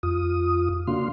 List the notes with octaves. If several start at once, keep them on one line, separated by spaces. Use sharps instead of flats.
F2 F4 D#6
C#3 A#3 D4 F#4 F5 C6